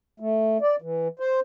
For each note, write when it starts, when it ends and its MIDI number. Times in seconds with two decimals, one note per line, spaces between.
0.20 0.58 57
0.61 0.76 74
0.82 1.08 52
1.19 1.40 72